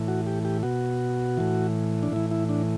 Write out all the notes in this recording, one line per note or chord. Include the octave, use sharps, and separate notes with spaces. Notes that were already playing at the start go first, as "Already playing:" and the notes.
Already playing: A2 E3
F#4
G4
G4
B2 F#4
A2 E3
D4
A2 E3 E4
E4
D4